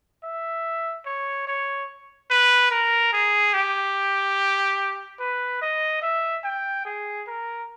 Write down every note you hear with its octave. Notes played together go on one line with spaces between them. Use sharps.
E5
C#5
C#5
B4
A#4
G#4
G4
B4
D#5
E5
G5
G#4
A#4